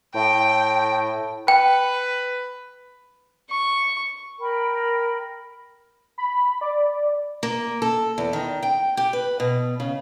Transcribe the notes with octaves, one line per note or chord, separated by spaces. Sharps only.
A2 G5
B4 G5
C#6
A#4 G5 B5
B5
D5
A#3
A4
E2
D#3
G5
G4
B4
B2
C#3